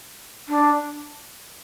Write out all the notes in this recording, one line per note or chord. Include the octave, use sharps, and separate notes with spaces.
D4